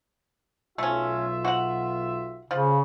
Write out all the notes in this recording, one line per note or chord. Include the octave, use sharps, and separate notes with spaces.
B1 A3 C#4 F4 E5
F#4 F#5
C#3 F3